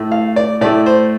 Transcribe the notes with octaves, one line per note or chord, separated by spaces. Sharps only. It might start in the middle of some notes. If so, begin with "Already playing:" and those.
Already playing: A2 A3
F5
D5
A2 A3 D5
C5